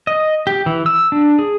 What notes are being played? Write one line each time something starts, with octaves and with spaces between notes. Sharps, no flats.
D#5
G4
E3
E6
D4
G#4